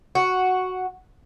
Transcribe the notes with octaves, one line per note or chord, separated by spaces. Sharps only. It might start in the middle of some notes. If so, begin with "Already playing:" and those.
F#4